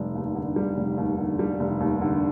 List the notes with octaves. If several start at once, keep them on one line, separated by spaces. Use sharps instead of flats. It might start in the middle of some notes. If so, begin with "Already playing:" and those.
Already playing: F1 G3
D#2
D3
G3
F1
D#2
D3
G3
F1
D#2
D3